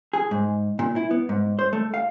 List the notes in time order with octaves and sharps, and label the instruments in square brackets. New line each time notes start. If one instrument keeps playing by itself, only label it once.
[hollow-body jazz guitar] G#4
G#2
A#2
E4
B3
G#2
C5
A3
F5